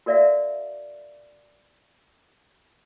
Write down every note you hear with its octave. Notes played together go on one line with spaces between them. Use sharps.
F#4 A#4 D5 E5 F5